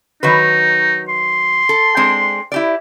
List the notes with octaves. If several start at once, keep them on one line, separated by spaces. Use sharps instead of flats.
D#3 F#3 D#4 B4
C6
A4
G#3 C4 D4
E4 G4 D5